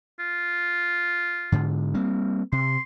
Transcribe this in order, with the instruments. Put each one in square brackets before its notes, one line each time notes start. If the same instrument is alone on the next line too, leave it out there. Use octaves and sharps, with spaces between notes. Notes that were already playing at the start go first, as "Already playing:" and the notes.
[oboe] F4
[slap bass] G#2 D3
G3 A#3 C4
[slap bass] C3 [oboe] C6